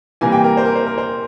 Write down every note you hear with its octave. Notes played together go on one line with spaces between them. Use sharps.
C3 E3 G3 A#3 G#5
G5
A#4
C5
A#4
C5
A#4
C5